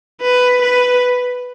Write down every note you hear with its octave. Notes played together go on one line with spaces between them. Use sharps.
B4
B4